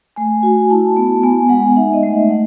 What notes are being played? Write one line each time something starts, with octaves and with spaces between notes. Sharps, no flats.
A3 G#5
F#4
E4 A5
B3
B3 G#5
G#3 F#5
D#4 E5
D#5
A3
E5
A3 F#5